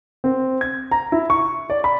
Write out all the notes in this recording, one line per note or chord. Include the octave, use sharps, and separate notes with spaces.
C4
G#6
A#5
E4
C#6
D5
B5